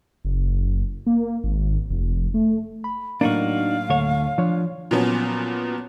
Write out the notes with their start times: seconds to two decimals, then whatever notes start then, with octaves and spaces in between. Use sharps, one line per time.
0.25 F#1
1.07 A#3
1.44 G#1
1.91 F1
2.34 A3
2.84 B5
3.21 A2 F#3 A#3 D4 D#4 F#4 F5
3.90 D2 A4 C#5
4.38 F3 D4 C#5
4.91 A#2 F3 F#3 B3 C#4